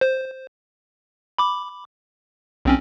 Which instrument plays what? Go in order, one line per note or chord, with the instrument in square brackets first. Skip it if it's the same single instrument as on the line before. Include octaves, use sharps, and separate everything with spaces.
[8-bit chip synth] C5
B5 D6
B1 C4 C#4